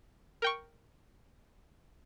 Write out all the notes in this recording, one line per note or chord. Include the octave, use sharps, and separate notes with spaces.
A#4 G5 C#6